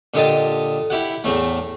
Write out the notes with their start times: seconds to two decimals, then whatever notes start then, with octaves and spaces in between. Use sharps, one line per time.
0.14 A#2 D3 G4 D#5 A5
0.90 E4 G4 F#5
1.24 E2 A2 A3